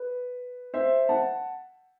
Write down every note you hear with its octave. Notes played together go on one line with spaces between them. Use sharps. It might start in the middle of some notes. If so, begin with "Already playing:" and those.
Already playing: B4
C5 E5
F#5 A5